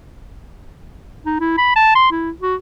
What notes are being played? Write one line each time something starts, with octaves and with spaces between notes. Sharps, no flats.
D#4
E4
B5
A5
C6
E4
F#4